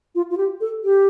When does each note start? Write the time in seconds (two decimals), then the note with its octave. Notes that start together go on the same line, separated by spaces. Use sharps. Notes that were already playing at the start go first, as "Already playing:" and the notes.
0.15 F4
0.31 F4
0.37 G4
0.61 A4
0.84 G4